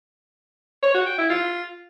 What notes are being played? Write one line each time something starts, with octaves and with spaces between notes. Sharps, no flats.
C#5
F#4
G5
E4
F4